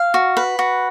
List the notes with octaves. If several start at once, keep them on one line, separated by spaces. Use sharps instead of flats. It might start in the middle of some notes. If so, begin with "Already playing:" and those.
Already playing: F5
F#4
B4
F#4